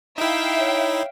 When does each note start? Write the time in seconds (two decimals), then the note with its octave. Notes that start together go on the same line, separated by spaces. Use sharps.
0.18 D#4 E4 E5 F5 G5
0.59 C#5